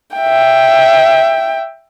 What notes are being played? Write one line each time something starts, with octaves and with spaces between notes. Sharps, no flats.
E5 G5